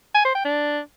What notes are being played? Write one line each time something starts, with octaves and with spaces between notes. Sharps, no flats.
G#5
C5
G5
D4